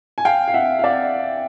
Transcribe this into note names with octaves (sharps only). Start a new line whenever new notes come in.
G#5
F5 G5
F5
E5 F#5
F5
D5 E5